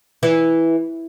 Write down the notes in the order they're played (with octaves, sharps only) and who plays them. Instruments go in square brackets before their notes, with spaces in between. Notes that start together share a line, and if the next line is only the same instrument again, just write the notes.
[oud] E3